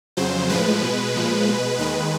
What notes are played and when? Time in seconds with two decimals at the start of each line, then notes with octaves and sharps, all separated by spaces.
0.17 F2 C#3 F#3 C5
0.49 A2 F3 G#3 B4
0.82 B2 G#3
1.14 A#2 F3 G#3
1.46 B2 G#3
1.78 D#2 D#3 G#3 B4